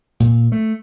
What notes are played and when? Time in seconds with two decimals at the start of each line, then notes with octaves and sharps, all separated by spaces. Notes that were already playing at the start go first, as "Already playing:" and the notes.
0.20 A#2
0.52 A3